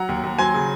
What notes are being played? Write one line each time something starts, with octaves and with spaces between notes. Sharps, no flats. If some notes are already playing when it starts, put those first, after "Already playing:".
Already playing: F#3 F#5 A#5
D#2
D#2
F#3 G#5 C6
C#3